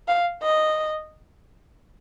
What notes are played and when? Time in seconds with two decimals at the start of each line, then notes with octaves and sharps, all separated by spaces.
0.08 F5
0.43 D#5